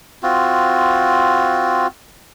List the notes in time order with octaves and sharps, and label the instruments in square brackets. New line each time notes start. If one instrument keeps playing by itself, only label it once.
[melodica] C4 F4 F#4